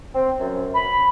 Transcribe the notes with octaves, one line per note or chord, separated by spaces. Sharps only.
C4
F#2
B5